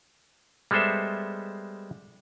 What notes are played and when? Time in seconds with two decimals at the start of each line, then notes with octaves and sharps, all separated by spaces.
0.71 G3 G#3 B3 A4 C5 E5